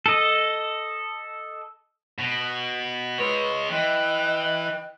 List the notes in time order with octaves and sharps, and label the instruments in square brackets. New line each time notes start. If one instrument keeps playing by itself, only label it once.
[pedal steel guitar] A4 D#5
[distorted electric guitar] B2
[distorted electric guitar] G#3 C#5 [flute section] B4
[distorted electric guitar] E3 [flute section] D#5 G5 F#6